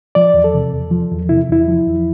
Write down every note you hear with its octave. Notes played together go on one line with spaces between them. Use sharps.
F3 D5
E2
A4
C3
E2
F3
E2
C3 E4
E2 E4
F3
E2